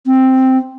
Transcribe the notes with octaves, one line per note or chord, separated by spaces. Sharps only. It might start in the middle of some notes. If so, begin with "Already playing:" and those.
C4